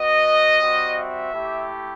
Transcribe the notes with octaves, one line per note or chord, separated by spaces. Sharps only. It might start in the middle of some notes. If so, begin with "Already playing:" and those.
Already playing: B3 F#4 D#5
G3 C4 F#4
E5
A3 E4 G4